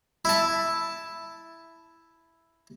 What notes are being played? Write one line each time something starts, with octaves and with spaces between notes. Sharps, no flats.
E4 A5